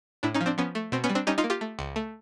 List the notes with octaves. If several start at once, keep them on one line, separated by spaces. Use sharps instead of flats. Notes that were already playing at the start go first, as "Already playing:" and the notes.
A2 D4 E4
C#4 D#4
F3
C4 D4
F3 B3 C#4
A3
B2 C4
B3 C#4
G3
C4 D4
G3 C#4 D#4
D#4 F4
A#3
F4 G4
A3
C#2
A3